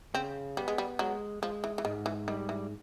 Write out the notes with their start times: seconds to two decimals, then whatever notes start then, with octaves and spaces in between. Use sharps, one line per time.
0.14 C#3 C4
0.57 G3 B3
0.68 G#3
0.78 G3
0.99 F#3 G#3
1.42 F3 G#3
1.64 E3
1.78 E3
1.85 G#2 D#3
2.06 E3
2.28 D#3 G3
2.49 E3